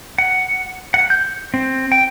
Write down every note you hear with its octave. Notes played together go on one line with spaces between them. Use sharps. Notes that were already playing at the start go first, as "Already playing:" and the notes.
F#5
F#5
G6
C4
G5